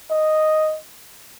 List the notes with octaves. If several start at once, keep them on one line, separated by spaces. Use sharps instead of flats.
D#5